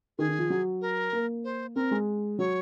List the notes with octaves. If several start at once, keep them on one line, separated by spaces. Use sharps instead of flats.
D#3 G#4
D#3
F3
F#3
A#4
A#3
C5
C4 A#4
G#3
F#3 C#5